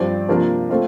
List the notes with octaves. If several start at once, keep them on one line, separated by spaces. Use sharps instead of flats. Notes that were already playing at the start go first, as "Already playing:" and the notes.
Already playing: G2 F3 C4 D5
C3 F3 A#3 D4 F4
A3 C4 F4